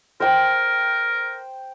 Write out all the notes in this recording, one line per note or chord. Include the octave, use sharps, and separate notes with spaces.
A#4 C5 G5